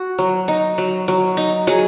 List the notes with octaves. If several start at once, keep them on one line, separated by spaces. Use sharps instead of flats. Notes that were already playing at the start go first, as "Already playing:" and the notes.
Already playing: F#4
F#3
D#4
F#3
F#3
D#4
F#3 G#4